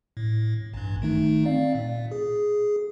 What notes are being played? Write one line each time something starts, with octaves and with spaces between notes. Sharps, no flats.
A2
A1 G2
D#3 A3 D#4
C4 D5 F5
A#2
G#4